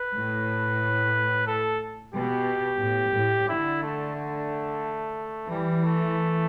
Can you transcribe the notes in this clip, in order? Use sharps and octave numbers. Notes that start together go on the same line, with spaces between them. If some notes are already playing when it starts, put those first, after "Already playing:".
Already playing: B4
A2
A4
B2 G4
A2
A2
D3 E4
A3
A3
E3 G3
A3